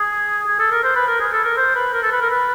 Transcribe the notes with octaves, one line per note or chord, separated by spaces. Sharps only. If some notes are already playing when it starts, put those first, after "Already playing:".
Already playing: G#4
G#4
A4
A#4
C5
B4
A#4
G#4
A4
A#4
C5
B4
A#4
A4
B4
A#4
B4